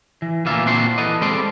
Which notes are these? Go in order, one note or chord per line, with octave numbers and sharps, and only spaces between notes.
E3
D2 A#2 E3 A#3 F4 E5
A#2 C4 D4 F#4 C6
E3 A4 B4 D#5
G3 G#3 C4 A4 D5 C6